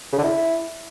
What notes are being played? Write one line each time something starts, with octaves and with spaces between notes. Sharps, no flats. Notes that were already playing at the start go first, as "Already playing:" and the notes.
C#3
D3
E4